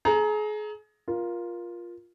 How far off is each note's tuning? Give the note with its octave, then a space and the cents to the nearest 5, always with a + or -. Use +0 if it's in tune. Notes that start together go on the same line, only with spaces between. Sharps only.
G#4 +35 A#5 +0
F4 +0 A#4 +20